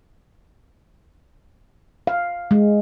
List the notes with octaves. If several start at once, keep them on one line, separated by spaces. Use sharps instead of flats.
F5
G#3